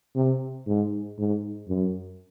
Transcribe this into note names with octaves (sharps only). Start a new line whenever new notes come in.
C3
G#2
G#2
F#2